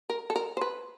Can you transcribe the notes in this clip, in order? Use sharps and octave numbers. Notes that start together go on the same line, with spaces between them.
A#4
A4
A#4
C5
B4